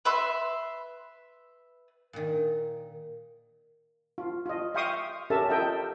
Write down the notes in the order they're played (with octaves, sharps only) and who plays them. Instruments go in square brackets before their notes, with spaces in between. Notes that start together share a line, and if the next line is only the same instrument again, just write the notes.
[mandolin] B4 E5 C6
[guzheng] A#2 D#3
[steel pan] F4
F4 D#5
E5 F5 G5 C6 C#6 D#6
C#4 G4 A4 A#4 E5 A5
F4 A4 D#5 E5 G5